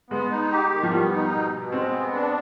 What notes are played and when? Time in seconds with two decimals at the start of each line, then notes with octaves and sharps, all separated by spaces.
0.10 G#3 B3
0.31 D#4
0.51 G4
0.71 D#3
0.83 F3
0.91 G3 B3
1.12 D#4
1.32 B2
1.52 B2
1.72 G#3 C4
1.92 B3
2.13 D4